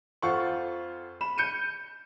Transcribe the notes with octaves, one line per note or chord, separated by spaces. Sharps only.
F2 F4 A4 C5 F#5 C#6
B5 E7
G6 C#7 D#7